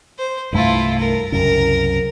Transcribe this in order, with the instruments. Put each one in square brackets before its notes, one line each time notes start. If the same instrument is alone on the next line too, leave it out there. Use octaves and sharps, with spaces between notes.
[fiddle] C5
[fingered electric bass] C2 G2 A3 [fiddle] E4 F4
[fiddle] A#4
[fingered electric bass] C2 F#2 C#3 [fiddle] A#4